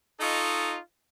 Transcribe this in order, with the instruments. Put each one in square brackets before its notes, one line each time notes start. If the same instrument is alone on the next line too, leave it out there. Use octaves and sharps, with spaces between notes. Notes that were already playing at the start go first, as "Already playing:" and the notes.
[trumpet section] D#4 F4 A4 D#5 C#6